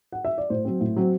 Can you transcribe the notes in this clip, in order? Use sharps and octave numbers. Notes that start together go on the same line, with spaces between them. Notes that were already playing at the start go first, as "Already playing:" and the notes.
F#5
E5
D5
A2 C5
F#3 C4
A2
F#3 C4